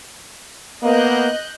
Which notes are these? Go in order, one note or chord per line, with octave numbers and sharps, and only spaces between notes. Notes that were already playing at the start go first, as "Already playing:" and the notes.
A#3 B3 D#5 F#6 G6